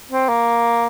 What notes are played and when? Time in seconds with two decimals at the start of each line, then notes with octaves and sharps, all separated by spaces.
0.11 C4
0.28 A#3